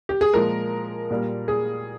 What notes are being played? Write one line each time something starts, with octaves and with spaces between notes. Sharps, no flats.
G4
G#4
A#2 F3 G#3 A#4
A#2 G3 A#3
G#4